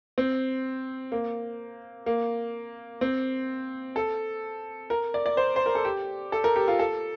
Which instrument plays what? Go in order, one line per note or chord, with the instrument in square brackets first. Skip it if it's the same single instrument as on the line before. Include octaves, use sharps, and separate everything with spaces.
[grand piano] C4
A#3
A#3
C4
A4
A#4
D5
D5
C5
C5
A#4
A4
G4
A4
A#4
G4
F4
A4